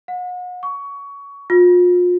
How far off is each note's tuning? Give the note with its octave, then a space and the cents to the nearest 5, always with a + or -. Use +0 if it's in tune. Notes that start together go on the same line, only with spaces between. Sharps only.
F#5 -40
C#6 +20
F4 +35